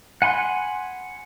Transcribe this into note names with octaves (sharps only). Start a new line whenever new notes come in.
F#5 G#5 B5 C6